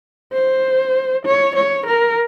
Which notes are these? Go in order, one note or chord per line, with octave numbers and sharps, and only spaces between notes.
C5
C#5
C#5
A#4